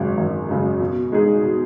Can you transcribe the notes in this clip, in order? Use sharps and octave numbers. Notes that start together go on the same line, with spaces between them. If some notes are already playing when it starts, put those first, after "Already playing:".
Already playing: G#1 F#2 C#3 G#3
G#1
F#2 C#3 G#3
B2
G#3 D#4 G#4
B2